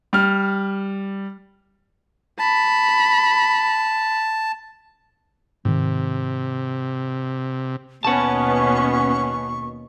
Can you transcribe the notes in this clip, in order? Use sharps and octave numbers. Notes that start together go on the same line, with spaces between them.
G3 F6
A5 B5
G#2 C3 D#3
D#2 B2 B3 C#4 F#5 A5 C#6